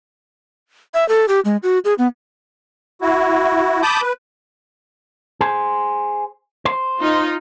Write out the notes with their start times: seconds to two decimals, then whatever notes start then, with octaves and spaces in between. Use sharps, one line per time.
0.94 E5
1.09 A4
1.28 G4
1.45 G#3
1.63 F#4
1.85 G#4
1.98 B3
3.02 E4 F#4
3.82 A5 B5 D6 D#6 G6
4.02 B4
5.41 G#4 C5
6.65 C5
7.00 D#4 F4